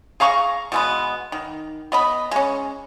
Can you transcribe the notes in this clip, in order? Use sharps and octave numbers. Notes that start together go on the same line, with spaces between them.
G#4 F5 A#5 C#6
B2 G#3 B3
D#3
B3 D#5 B5
G#3 C#4